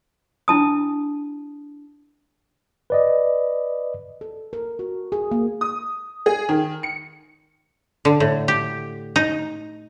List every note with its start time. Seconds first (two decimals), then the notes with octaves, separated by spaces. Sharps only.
0.48 D4 E4 A5 D#6
2.90 B4 D5 D#5
4.21 A4
4.53 A#4
4.79 F#4
5.12 G#4
5.31 A#3
5.61 D#6
6.26 G#4
6.49 D#3
6.83 C#7
8.05 D3
8.20 A2
8.48 G4
9.16 D#4